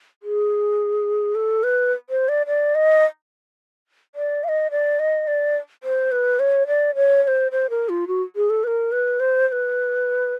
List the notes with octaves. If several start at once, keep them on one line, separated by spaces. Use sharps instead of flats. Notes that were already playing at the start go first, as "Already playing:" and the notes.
G#4
A4
B4
C5
D5
D5
D#5
D5
F5
D#5
D5
D#5
D5
C5
B4
C#5
D5
C#5
C#5
C5
C5
A#4
F4
F#4
G#4
A4
B4
A#4
B4
C5
C5
B4